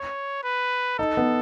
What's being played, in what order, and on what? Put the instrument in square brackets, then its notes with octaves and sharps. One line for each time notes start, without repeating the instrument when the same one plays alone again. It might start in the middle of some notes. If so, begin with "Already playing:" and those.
Already playing: [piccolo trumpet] C#5
B4
[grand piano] D#4 [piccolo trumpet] A4
[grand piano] B3